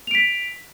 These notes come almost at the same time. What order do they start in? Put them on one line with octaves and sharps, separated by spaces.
F7 D7 B6